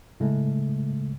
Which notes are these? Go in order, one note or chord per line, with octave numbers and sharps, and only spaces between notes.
A2 C#3 G#3 A3